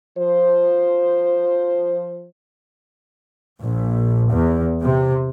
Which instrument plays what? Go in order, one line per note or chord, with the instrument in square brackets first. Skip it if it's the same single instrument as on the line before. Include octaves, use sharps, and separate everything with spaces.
[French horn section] F3 C5
[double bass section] A#1
E2
C3